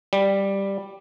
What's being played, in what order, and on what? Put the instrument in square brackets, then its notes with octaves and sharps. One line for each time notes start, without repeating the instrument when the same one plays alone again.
[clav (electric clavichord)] G3